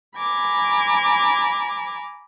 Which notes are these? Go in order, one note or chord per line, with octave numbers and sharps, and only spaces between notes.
G#5 A#5 B5 D6 G#6